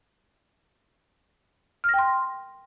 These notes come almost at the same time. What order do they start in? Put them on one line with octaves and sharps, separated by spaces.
F6 A#6 G5 C6